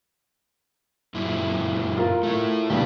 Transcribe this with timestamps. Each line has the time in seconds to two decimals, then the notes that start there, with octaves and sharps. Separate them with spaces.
1.14 F#2 A#2 E4
1.97 F4 A#4
2.23 A3 E4
2.70 C#2 B2 D3 G3 D4 G4